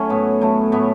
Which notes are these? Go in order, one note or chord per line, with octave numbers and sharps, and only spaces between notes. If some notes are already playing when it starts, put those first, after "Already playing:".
Already playing: F#3 A3 C#4 E4
A2 B3
F#3 A3
A2 B3